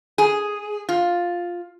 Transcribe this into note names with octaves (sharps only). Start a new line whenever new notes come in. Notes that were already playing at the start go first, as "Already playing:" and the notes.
G#4
F4